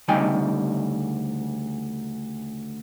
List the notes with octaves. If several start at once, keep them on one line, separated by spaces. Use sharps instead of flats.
D2 C#3 G3 D#4 G5 G#5